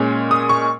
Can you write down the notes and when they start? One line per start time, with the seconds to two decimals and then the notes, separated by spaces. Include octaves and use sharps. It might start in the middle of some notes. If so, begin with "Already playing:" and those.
Already playing: A#2 G#3 C#4
0.31 D#6
0.49 C#6